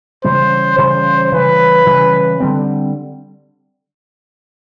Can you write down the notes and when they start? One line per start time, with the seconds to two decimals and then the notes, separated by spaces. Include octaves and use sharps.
0.24 C#3 E3 G3 C5
0.78 C#3 E3 G3 C5
1.32 C#3 E3 G3 B4
1.86 C#3 E3 G3
2.40 D3 G3 C4